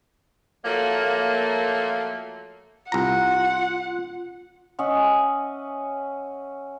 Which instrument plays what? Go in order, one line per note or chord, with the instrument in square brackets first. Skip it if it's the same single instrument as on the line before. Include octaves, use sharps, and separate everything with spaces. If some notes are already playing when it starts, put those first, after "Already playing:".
[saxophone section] F3 F#3 A3 A#3
[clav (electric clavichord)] C2 A#5 [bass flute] F4 [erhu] F#5
[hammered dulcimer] C#4 D#5 E5 F#5